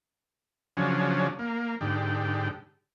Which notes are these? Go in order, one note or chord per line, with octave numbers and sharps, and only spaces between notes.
C#3 F3 F#3 C#4 D4
A#3
G#2 D3 G4